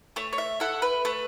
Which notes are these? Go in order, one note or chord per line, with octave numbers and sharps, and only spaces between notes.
A3 C#5
C#5
E5
E4 A4 F#5
B4
A3 B4